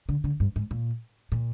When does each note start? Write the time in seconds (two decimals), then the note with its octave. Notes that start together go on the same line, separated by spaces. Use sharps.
0.09 D3
0.24 D3
0.40 G2
0.56 G#2
0.71 A#2
1.32 A#2